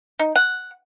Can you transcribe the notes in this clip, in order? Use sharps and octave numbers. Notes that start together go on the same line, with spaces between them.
D#4
F#5